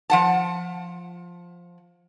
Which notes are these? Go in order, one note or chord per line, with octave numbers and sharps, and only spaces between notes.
F3 F#5 A5